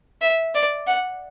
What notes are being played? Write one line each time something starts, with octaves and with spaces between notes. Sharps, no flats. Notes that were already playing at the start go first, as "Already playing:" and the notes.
E5
D5
F#5